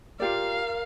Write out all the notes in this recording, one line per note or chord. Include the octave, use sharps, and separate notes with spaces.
F4 G4 A#4 D5 F5